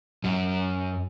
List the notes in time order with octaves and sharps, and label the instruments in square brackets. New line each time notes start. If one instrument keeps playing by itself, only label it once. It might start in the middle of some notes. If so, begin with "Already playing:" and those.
[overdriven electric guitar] F#2